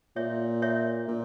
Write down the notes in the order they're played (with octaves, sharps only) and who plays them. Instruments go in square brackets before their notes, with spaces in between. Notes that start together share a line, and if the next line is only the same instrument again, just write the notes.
[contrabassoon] A#2 [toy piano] C#5 E5
[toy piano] C#5 E5
[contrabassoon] A#2